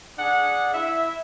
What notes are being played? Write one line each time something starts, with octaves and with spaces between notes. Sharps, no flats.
D4 G#4 F#5
E4 E5